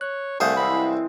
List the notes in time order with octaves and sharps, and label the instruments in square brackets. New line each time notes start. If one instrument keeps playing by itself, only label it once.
[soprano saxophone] C#5 [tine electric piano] F#6
[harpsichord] C2 C5 D#6 [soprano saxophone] A3 [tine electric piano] F5 F#5 G#5
[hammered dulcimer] E3 G#3 C4 [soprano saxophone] B5